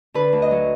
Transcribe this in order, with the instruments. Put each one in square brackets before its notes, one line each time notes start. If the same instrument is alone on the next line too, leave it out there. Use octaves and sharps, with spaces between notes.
[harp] D3 B4
D2
D#5
F#3